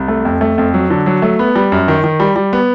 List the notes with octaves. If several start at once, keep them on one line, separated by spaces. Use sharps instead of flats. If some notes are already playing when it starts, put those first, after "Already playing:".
Already playing: C2
A3
F2
A3
F2
F#3
D3
F#3
A3
B3
G3
F#2
D#3
D#3
G3
G3
B3